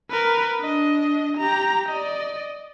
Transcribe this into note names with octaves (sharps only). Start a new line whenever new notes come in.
A#4 B4
D4 D#5
G4 A#5
D5 D#5